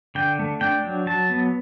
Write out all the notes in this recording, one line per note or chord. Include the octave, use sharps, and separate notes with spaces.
D3 G5
A3
D4 G5
F#3
F#3 A5
B3